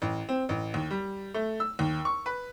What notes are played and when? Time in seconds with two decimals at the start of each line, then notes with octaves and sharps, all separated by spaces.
0.02 A1
0.29 C4
0.49 A1
0.74 D#2
0.91 G3
1.34 A3
1.60 E6
1.79 D#2
2.05 C#6
2.26 B4